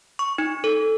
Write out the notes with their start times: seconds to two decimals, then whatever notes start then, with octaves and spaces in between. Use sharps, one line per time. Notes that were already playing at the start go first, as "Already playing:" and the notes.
0.19 C#6
0.38 D#4
0.64 A4